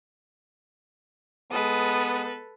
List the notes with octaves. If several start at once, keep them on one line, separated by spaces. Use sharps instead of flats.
G#3 B3 A4 B4 D#6